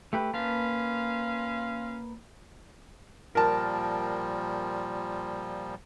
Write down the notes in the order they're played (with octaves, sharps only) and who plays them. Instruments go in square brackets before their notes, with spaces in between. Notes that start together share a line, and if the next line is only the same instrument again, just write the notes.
[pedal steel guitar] A3 G4 B4
[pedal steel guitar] A#3 B4 A5 [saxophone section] C#4 F4 F5
[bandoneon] A#2 F3 G3 [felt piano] A#4 A5